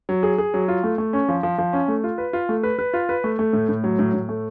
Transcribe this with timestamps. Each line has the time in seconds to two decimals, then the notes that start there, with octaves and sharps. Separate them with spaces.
0.09 F#3
0.23 G#4
0.38 G#4
0.54 F#3
0.68 F4
0.84 A3
0.98 A3
1.13 C#4
1.29 F3
1.43 F3
1.58 F3
1.73 C#4
1.88 A3
2.04 F4
2.18 B4
2.33 F4
2.49 A3
2.63 B4
2.79 B4
2.93 F4
3.09 B4
3.24 A3
3.39 A3
3.53 A2
3.69 A2
3.84 F#3
3.99 A2
4.14 A2
4.29 A3